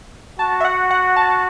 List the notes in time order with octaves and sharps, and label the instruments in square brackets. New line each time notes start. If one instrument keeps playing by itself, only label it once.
[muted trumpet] F#4 [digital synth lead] A5
[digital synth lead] E5
F#5
F#5
A5